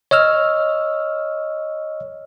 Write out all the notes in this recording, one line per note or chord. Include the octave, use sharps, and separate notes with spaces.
C#5 D#5 E6 F6